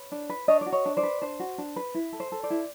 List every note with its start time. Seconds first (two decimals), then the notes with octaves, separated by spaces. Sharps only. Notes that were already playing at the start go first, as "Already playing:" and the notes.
Already playing: B4 C#5
0.12 D4
0.29 B4
0.48 D4 C#5 D#5
0.61 F#4 D5
0.72 C#5 D#5
0.86 D4
0.97 C5 D5
1.03 B4
1.22 D4 C5
1.39 F#4
1.58 D4
1.76 B4
1.94 E4
2.13 A4
2.20 C5
2.32 A4
2.43 C5 D5
2.50 E4